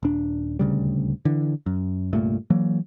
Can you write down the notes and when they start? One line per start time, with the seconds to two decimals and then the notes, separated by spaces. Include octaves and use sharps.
0.03 D#1 D4
0.59 D#1 D2 C#3 G3
1.25 D3 E3
1.66 F#2
2.13 C2 G2 A#2 A3
2.50 E3 F#3 A#3